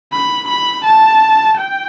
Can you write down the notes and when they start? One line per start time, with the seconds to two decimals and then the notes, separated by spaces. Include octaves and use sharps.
0.13 B5
0.48 B5
0.85 A5
1.57 G5